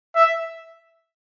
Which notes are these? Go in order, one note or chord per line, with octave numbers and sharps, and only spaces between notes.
E5